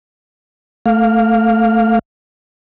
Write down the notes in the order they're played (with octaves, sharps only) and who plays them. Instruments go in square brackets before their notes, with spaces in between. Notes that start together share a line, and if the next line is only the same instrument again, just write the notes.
[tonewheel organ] A3 F5